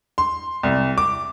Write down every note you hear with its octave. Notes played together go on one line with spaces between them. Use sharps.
C6
C2
D6